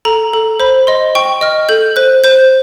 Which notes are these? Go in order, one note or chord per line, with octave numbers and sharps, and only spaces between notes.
A4 A#5
A4
C5 B5
D#5 C6
G5 C#6
D#5 F6
A4 G6
C5 F#6
C5 G6